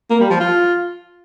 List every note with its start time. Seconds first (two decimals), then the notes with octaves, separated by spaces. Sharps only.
0.10 A#3
0.20 G3
0.30 F3
0.40 F4